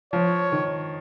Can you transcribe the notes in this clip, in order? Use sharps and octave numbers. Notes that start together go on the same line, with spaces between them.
F3 C#5
D#3